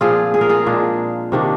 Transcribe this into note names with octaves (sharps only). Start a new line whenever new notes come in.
A#2 F3 C4 F4 G#4
G#4
A#4
F4 G#4
A#2 G#3 D4
C3 D#3 A#3 D4